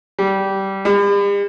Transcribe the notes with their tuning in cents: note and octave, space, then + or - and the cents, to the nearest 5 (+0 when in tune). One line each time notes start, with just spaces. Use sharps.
G3 -15
G3 +45